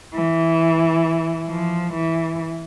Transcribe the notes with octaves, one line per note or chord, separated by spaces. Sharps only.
E3
F3
E3